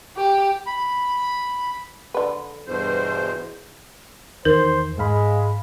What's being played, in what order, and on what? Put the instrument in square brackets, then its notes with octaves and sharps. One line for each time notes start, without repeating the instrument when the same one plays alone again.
[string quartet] G4
[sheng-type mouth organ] B5
[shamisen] D3 B4
[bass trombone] E2 [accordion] G2 B2 C5
[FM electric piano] E2 D#3 [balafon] A#4 [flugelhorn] C5
[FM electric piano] G#2 F5 B5 [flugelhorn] G#3